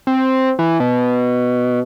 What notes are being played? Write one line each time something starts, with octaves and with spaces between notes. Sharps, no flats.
C4
E3
B2